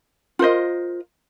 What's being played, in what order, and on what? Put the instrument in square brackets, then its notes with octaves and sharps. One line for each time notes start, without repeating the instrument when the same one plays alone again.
[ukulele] F4 A#4 C5 D#5